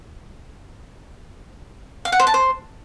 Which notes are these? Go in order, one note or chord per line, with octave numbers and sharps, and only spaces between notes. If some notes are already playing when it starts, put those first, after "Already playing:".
F5
F#5
C5
A5
C5